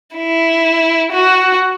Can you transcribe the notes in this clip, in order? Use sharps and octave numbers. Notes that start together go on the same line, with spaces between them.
E4
F#4